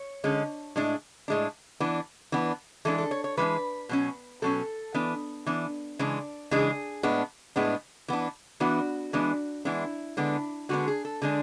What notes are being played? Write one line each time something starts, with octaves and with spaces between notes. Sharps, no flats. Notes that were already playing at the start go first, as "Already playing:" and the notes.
Already playing: C#5
D3 G#3 C#4
A2 G#3 D4
A2 G#3 D4
E3 B3 D4
E3 B3 D4
E3 G#3 D4 A4
A4
C#5
C#5
E3 G#3 D4 B4
B2 F#3 C#4
B2 F#3 C#4 A4
E3 B3 D4
E3 B3 D4
C#3 E3 G#3 D4
C#3 E3 G#3 D4 G#4
A2 G#3 B3 D4
A2 G#3 B3 D4
E3 B3 D4
E3 B3 D4 F#4
E3 G#3 B3 D4
E3 G#3 B3 D4 E4
D3 G#3 B3 D4
D3 G#3 B3 D4 F#4
G#4
A4
D3 G#3 D4 G#4